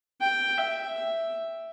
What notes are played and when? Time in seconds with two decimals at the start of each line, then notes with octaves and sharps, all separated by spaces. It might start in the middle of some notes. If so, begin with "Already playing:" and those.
0.21 G5
0.57 E5